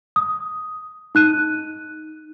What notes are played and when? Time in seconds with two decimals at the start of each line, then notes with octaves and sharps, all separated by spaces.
0.16 D#6
1.15 D#4 F#6 D#7